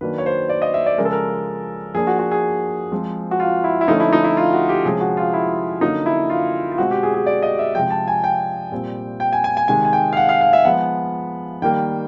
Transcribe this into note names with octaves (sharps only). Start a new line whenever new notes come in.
D#3 F#3 A#3 D4 B4
C#5
C5
D5
D#5
E5
D5
C#3 F3 G#3 A#4
A4
A#4
F3 A#3 D4 G#4
F#4
F#4
G#4
F3 G#3 C4
F#4
F4
E4
E4
D3 F3 A3 C#4 D#4
E4
D#4
E4
F4
F#4
G4
C3 F3 G#3 C#4 G#4
F#4
F4
E4
D3 F#3 A#3 C#4 D#4
E4
F4
F4
B2 G#3 C4 F#4
G4
G#4
G#4
D5
D#5
E5
C3 F3 G#3 G5
A5
G#5
G5
A#2 G3 C4
G5
G#5
G#5
G#5
C3 D#3 G#3 G#5
G#5
G5
F5
F#5
F5
F5
E5
F3 G#3 B3 F#5
D#3 G3 A#3 G5